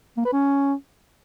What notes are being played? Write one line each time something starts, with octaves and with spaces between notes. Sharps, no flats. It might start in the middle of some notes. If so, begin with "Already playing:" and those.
A#3
B4
C#4